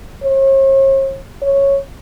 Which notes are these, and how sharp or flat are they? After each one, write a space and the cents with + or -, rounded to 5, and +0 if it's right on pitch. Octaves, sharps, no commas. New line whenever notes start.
C#5 -45
C#5 -5